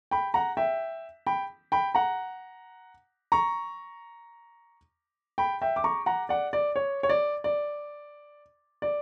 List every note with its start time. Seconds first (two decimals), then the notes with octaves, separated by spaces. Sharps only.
0.11 G5 B5
0.34 F#5 A#5
0.57 E5 G5
1.27 G5 B5
1.72 G5 B5
1.95 F#5 A#5
3.32 A#5 C#6
5.38 G5 B5
5.62 E5 G5
5.76 D6
5.84 A#5 C#6
6.06 F#5 A#5
6.29 D5 F#5
6.53 D5
6.76 C#5
7.03 C#5
7.09 D5
7.44 D5
8.82 D5